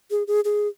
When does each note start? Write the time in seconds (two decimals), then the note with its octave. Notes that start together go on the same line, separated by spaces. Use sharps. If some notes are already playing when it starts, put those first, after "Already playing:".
0.11 G#4
0.27 G#4
0.44 G#4